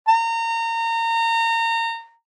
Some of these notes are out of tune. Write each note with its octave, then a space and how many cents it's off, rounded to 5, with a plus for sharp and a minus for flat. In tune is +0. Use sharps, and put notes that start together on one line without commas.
A#5 -30